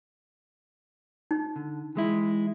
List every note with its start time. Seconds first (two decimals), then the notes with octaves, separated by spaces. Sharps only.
1.31 D#4
1.56 D3
1.96 E3 G#3 E4